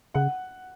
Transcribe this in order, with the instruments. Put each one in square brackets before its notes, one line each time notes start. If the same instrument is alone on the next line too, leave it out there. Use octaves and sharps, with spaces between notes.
[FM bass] C#3 [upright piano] F#5